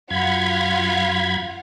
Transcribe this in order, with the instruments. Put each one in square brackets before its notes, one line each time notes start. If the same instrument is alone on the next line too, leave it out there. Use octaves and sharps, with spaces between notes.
[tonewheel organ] F#2 B5 G#6 [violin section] F4 F5 F#5